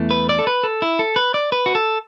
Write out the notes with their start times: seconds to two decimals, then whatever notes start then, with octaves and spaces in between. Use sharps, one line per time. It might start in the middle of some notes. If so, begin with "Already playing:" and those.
Already playing: E2 E3 A3
0.11 B4
0.29 D5
0.39 A4
0.47 B4
0.63 A4
0.82 E4
0.99 A4
1.16 B4
1.34 D5
1.52 B4
1.66 F#4
1.75 A4